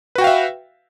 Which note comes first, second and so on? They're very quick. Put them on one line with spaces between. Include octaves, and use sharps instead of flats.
B4 F#4 G5 F5 E5